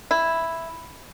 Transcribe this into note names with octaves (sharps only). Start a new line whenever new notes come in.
E4